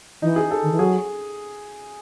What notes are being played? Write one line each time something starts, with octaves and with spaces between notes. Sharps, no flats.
E3 D#4
G#4
A4
D#3
E3
F#3 G#4